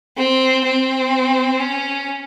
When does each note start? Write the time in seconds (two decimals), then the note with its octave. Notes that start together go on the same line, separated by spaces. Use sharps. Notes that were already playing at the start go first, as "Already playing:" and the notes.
0.17 C4
0.64 C4
1.60 C#4